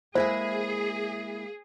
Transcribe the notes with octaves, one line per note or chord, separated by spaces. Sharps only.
G#3 A#3 E4 G#4 C5 E5 G#5